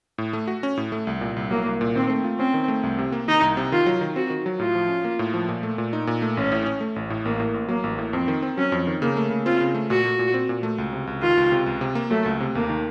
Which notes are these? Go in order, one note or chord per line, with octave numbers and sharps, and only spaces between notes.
A2
A3
F#4
C#4
A2
A3
C2
A#2
C2
F#3 A#3
C2
A#2
D#3 C4
A3
F4
C4 C#4
D#3
A3
C2
C3
A#3
D#3 D#4
C2
C3
D#3 F4
F#3
D#3
C4 F#4
D#3
F#3
A2 F4
F3
C#4
A#3
A2
F3
A#2
A3
A#2
D#4
A#2
A3
A1 C#4
A2
C#4
A3
A1
A2
A1 A#3
A2
A1
F#3 A#3
A1
A2
F2 C4
D#3
C4
F#3 C#4
F2
D#3
C#3 A#3
A3
C#3
C4 F4
C#3
A3
A#2 F#4
A3
A#2
C4
A#2
A3
C#2
C3
C#2
D#3 F4
C#2
C3
C#2
C3
A#3
F#3 A3
C#2
C3
D#2 A#3
D#3